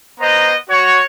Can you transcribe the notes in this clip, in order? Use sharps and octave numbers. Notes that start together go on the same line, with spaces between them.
B3 C5 D#5 A#5
F#4 C#5